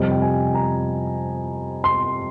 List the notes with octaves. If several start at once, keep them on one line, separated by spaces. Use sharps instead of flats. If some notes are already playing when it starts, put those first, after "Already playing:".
Already playing: F2 C3 G3 D#5
G5
G#5
A#5
C6